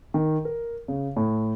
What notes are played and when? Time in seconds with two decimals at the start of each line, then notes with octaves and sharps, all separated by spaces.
0.14 D#3
0.45 A#4
0.88 C#3
1.16 A2